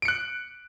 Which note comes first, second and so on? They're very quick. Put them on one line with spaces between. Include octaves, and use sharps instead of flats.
D7 C#7 F#6